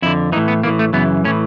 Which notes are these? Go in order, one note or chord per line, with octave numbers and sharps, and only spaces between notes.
F2 D3 E4
A2 E3 D#4
B3
A2 E3 A#3
A3
F#2 C#3 E3 B3
A2 E3 C#4